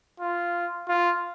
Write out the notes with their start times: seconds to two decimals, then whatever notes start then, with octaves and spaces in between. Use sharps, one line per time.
0.20 F4
0.88 F4